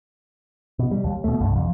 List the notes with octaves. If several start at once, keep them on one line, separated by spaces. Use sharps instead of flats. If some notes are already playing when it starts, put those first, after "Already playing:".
B2
G3
D#2
B2 A3
C2 G2
F2